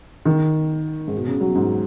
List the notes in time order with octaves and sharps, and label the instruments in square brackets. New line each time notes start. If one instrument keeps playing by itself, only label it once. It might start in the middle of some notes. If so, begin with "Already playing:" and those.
[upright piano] D#3
G#2
B2
C#3
F#3
G#2